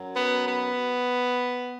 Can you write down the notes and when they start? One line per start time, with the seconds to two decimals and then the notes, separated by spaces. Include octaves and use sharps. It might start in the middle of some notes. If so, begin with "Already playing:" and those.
Already playing: F#2 F#3
0.14 B3
0.46 B3